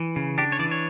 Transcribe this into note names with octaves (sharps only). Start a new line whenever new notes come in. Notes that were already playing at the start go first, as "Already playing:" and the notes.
Already playing: E3
C#3
D4 G4
C#5
E3 D5
C#5